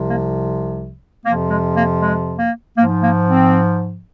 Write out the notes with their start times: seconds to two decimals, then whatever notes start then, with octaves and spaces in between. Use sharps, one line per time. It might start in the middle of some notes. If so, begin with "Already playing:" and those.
Already playing: C2 C3 F3
0.10 A#3
1.24 F2 C3 F3 A#3
1.49 G#3
1.75 A#3
2.00 G#3
2.39 A#3
2.76 G#2 F3 A#3
3.02 A#3
3.28 C4